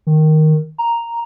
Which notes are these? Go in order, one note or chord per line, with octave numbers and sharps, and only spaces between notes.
D#3
A#5